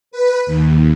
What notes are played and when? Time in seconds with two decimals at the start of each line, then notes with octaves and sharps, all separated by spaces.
0.11 B4
0.46 D#2